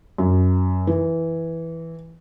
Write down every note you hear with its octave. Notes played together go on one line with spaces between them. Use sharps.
F#2
E3